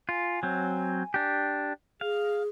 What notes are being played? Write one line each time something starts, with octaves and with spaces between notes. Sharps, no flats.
F4 G#5
F#3 C4
D4 G4
G#4 F5